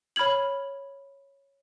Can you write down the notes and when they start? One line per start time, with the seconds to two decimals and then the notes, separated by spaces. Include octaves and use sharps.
0.16 C#5 B5 F6 G#6 F#7